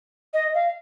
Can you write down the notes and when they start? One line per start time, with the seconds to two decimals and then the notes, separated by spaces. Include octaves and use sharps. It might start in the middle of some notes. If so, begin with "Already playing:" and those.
0.33 D#5
0.54 F5